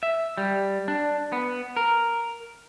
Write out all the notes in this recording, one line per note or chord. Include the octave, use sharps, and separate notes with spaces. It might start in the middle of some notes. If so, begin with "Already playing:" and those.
E5
G3
D4
B3
A#4